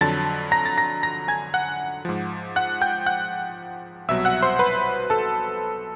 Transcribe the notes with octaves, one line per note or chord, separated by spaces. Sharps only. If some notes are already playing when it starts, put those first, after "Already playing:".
F2 D3 F#3 A5 A6
A#5 A#6
A6
A#5 A#6
A#5 A#6
G#5 G#6
F#5 F#6
G#2 F3
F#5 F#6
G5 G6
F#5 F#6
C2 B2 F#3 E5 E6
F#5 F#6
C5 C6
B4 B5
A4 A5